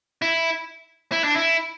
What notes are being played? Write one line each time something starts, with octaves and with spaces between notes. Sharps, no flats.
E4
E4
D4
E4